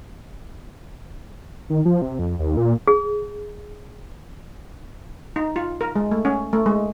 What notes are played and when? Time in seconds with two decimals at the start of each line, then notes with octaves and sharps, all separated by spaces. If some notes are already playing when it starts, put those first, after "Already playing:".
1.70 D#3
1.85 F3
2.02 C3
2.19 F2
2.39 D#2
2.57 A#2
2.88 G#4
5.36 D#4
5.56 F4
5.81 A#4
5.96 G#3
6.11 A3
6.25 C#4
6.53 A3
6.66 G#3